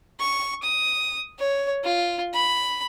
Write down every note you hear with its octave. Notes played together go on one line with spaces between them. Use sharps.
C#6
D#6
C#5
F4
B5